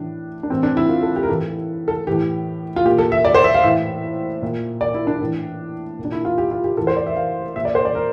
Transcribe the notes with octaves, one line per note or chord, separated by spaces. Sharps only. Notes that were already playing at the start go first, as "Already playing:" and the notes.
Already playing: A2 E3 D4
D4
A2 E3 C4
D4
E4
F4
A4
G4
A#4
A2 E3 A4
A4
A2 E3 G4
F4
A#2 G4
A4
E5
D5
C5
E5
F5
A2 E3 E5
A#2
D5
E4
D4
A2 E3
A#2
D4
E4
F4
G4
F4
G4
A2 E3 A4
C5
D5
E5
F5
A#2 E5
D5
C5
D5
A#4